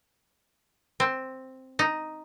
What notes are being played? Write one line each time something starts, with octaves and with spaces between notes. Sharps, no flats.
C4
D#4